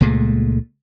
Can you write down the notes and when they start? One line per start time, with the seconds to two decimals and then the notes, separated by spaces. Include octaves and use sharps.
0.01 C#2 A#2 G#3 A3